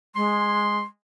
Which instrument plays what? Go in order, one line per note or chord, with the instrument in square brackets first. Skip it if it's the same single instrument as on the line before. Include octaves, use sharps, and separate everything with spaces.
[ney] G#3 [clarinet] C6